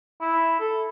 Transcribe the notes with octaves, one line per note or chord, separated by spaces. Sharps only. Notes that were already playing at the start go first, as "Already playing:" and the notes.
E4
A4